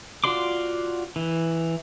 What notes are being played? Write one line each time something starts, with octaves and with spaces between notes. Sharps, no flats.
F4 F#4 D5 C6 D6
E3